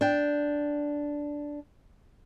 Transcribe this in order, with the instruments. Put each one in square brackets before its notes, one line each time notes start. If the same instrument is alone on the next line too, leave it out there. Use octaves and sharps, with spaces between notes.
[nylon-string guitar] D4 G5